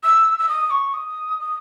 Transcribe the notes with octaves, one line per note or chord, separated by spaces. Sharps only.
E6
E6
D#6
C#6
D#6
D#6